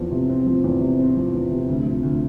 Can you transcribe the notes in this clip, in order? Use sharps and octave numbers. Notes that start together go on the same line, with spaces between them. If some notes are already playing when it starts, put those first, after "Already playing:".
Already playing: E2 F3 C4
C3
C4
F3
E2
C3
C4
F3
E2
C3
D2
F3
D2